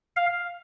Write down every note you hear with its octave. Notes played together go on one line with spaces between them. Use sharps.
F5